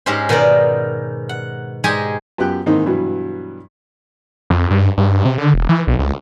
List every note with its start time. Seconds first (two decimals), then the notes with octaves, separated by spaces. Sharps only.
0.06 G#2 G#3 C#4 G4 C5
0.29 B2 D#3 D#4 A#4 D5
1.29 F#5
1.84 G#2 G#3 G4 G#4 G#5
2.38 F#2 B3 F4 G4 G5 F#6
2.66 G#2 D#3 E3 A#3 C4 D#4
2.86 G2 B2 E3 F#3
4.50 F2
4.71 G2
4.98 G2
5.25 C3
5.38 D3
5.54 E1
5.69 E3
5.87 B1
5.99 C#2